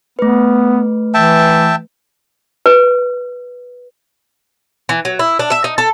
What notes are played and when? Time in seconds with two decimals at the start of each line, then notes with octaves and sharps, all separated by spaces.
0.19 A3 B3 B4
1.14 E3 E5 G5 A5
2.66 B4
4.89 E3
5.05 F#3
5.19 E4
5.39 D4
5.52 E5
5.64 D#4
5.78 A4